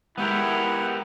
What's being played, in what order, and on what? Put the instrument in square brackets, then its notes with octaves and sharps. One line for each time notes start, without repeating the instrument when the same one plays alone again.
[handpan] G#3 [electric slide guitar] B3 G4 A#4 [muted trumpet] E4 [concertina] F#5